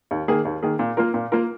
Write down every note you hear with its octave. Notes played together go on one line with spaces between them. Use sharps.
D#2
D#3 A#3 G#4
D#2
D#3 A#3 G#4
A#2
A#3 F4 A#4
A#2
A#3 F4 A#4